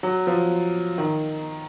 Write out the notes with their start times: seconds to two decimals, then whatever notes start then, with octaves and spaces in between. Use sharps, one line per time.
0.03 F#3
0.27 F3
0.98 D#3